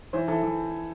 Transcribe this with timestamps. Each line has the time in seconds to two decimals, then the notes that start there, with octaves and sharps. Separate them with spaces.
0.13 E3 C5
0.28 E3 A4
0.43 E3